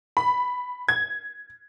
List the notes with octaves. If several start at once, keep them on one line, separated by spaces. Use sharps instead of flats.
B5
G#6